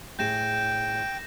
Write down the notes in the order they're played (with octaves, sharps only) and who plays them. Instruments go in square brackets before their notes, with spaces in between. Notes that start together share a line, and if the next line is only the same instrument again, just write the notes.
[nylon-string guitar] A2 G#4 [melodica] G5 [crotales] G6 A#6 E7